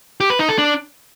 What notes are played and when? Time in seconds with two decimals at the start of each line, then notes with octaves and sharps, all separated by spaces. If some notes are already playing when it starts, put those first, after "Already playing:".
0.20 G4
0.30 B4
0.39 D#4
0.49 A4
0.58 D4